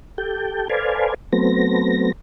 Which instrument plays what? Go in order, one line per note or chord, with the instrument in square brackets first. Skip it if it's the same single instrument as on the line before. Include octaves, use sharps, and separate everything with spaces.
[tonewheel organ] G4 A4 G5
A4 B4 C5 D5 F5 G#5
F#3 A3 B3 C4 A#6